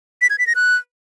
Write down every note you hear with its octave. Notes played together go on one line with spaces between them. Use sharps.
B6
G#6
B6
A#6
F#6